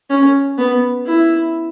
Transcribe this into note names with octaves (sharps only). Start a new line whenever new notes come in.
C#4
B3
E4